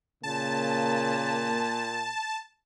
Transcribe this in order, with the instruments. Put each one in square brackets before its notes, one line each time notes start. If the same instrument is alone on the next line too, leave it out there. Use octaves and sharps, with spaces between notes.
[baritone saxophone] A#2 [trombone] C#3 [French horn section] A#3 [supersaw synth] A5